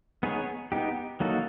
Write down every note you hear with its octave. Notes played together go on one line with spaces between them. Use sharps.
B3 D#4 G#4 C#5
B3 D#4 G4
F#3 A#3 D#4 F#4 A4